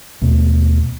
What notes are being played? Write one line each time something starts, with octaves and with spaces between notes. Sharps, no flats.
D#2 B2 A3 B3